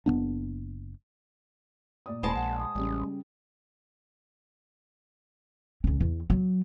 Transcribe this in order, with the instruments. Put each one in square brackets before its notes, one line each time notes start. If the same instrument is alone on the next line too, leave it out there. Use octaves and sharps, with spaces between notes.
[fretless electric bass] F#1 A#2 B3 D4
[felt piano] A#2 D5 D#6
[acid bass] E1 [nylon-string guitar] G#3 C5 A5 [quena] B5
[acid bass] A#1 [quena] F#5
[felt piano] F#5 [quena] D#6
[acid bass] A1 [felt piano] C#3 G3
[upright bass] C#2 C#4
E2
F#3